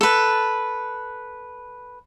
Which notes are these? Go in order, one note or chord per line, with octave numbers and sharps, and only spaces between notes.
A4 B4